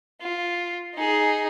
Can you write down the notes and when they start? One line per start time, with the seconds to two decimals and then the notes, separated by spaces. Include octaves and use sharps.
0.22 F4
0.95 D#4 G#4